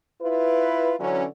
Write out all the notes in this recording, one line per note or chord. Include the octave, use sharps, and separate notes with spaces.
E4 F4 B4
D3 E3 F#3 C#4